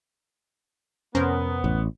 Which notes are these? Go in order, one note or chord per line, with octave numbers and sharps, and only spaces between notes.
F2 C3 B3 C#4 A#4 C5
A1